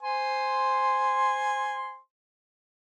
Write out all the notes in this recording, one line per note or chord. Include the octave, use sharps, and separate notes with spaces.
C5 G#5 C6